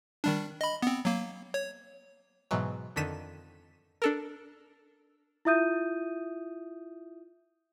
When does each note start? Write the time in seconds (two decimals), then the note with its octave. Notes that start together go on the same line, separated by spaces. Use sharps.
0.24 D#3 G3 D4
0.61 D#5 B5
0.82 B3 C4
1.05 F#3 A#3
1.54 C#5
2.51 G#2 B2 E3 F#3
2.96 F2 D3 D#3 B6 D#7 E7
4.02 D4 A4 A#4
5.45 E4 F4 E5 D#6 G6 D#7